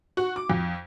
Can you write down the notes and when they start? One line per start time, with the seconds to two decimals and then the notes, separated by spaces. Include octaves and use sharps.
0.17 F#4
0.36 D6
0.50 F2